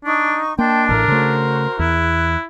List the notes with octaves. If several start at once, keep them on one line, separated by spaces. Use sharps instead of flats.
D4 D#4 C#6
A#3 D4 D#5 G5 A5 C6
A1 A2 A#4
C#3 A3 F#4 C5 C6
E2 E4 F#6